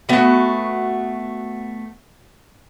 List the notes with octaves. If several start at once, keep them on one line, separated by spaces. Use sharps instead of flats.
A3 B3 F#4